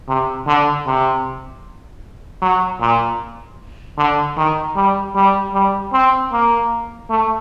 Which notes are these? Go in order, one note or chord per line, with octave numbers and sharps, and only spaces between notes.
C3
D3
C3
F#3
A#2
D3
D#3
G3
G3
G3
C4
A#3
A3